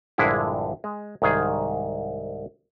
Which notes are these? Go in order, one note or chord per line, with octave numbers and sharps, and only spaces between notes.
A#1 G2 D3 G#3 E4 G#4
G#3
C2 G#2 D#3 G#4